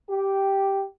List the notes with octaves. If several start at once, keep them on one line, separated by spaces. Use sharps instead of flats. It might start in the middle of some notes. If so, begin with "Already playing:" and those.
G4